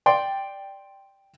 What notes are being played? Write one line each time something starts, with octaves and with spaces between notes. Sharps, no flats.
D5 G5 C6